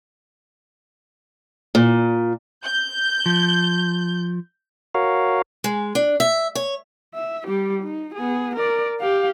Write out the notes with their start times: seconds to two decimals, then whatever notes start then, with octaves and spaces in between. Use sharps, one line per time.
1.75 A#2
2.63 G6
3.26 F3
4.95 F#4 A#4 C#5 F5
5.64 G#3
5.95 D4
6.20 E5
6.55 C#5
7.15 E5
7.48 G3 G4
7.83 D#4
8.15 B3 G#4
8.57 A#4 D5
9.00 G4 F5